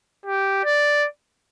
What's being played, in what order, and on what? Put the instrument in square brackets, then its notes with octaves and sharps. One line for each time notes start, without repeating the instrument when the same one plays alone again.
[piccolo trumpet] G4
D5